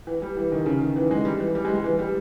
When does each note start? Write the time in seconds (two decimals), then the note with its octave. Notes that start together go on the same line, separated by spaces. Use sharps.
0.07 E3
0.22 G3
0.37 E3
0.52 D#3
0.66 C#3
0.81 D#3
0.96 E3
1.11 G#3
1.25 G3
1.40 E3
1.55 G3
1.65 G#3
1.74 G3
1.84 E3
1.99 G3